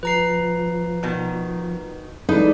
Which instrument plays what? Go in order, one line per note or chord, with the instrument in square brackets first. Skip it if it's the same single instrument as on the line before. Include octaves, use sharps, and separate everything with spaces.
[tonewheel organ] F3 [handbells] B4 A#5 C7
[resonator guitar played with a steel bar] B2 D#3
[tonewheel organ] E3 G#3 A4 [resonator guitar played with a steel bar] D4 B4 [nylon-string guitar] D#4